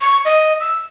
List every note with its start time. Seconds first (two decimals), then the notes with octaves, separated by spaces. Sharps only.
0.01 C#6
0.25 D#5
0.60 E6